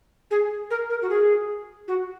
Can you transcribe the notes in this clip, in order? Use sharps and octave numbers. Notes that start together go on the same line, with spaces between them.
G#4
A#4
A#4
F#4
G#4
F#4